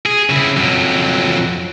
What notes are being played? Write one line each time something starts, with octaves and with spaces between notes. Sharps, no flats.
G#4
C#3 E4
F2 F#3